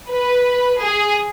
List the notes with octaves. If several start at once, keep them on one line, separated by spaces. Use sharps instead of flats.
B4
G#4